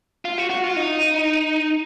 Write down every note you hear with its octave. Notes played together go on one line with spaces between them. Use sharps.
F4
F#4
F#4
F4
D#4